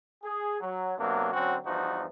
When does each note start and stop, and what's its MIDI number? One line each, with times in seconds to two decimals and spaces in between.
0.24 0.59 68
0.61 0.97 54
0.98 1.30 48
0.98 1.30 54
0.98 1.30 58
0.98 1.30 59
0.98 1.30 62
1.33 1.56 50
1.33 1.56 54
1.33 1.56 60
1.33 1.56 61
1.33 1.56 66
1.65 2.05 40
1.65 2.05 43
1.65 2.05 53
1.65 2.05 63
1.65 2.05 66